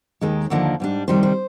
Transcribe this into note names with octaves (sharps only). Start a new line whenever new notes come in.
D#2 D#3 G#3
D#2 D3 F3 A#3 D4
G#2 G3 D4
C3 D#3 G3 C5
C5